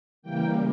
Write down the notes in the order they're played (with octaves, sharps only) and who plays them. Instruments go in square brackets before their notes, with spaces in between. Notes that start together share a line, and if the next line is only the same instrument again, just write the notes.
[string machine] C#3 E3 G3 A#3 G5